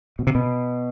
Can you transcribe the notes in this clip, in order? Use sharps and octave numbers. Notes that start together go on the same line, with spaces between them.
B2
C3
B2